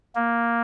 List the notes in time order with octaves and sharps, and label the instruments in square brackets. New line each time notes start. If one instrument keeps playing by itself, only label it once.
[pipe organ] A#3